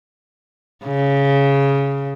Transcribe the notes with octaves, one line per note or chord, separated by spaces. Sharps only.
C#3